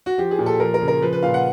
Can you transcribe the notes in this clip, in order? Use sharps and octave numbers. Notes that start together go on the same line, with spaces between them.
F#4
F3 G4
G#4
A#2
A4
F3 A#4
A#4
C#3
A#4
F3 B4
B4
A#2 F5
F#5